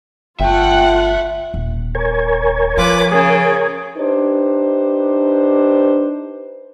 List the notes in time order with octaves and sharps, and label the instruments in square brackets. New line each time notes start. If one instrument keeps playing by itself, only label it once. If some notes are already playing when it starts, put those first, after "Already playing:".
[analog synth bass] G1 [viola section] F4 F#5 [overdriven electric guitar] E5 A5 [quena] G5
[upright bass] D#1
[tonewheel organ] A#4 C#5 G#5
[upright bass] F3 [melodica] F4 [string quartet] B4 D6
[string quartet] C#3 [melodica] G#4
[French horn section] D4 D#4 G4 B4 C5